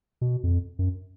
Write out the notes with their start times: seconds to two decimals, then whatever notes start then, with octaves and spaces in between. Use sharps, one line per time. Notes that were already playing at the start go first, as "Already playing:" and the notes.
0.21 B2
0.43 F2
0.79 F#2